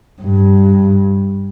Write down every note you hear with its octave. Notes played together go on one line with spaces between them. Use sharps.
G2